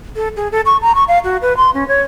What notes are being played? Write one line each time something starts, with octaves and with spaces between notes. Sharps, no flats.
A4
G#4
A4
C#6
A#5
C#6
F5
F#4
B4
C6
C#4
C#5